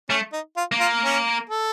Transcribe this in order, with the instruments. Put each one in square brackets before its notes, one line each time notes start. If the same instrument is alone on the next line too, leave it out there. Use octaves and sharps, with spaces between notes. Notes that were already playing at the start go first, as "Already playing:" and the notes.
[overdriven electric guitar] A3 [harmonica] C#4
[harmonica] D#4
F4
[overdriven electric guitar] A#3
[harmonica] F4
C#4
A4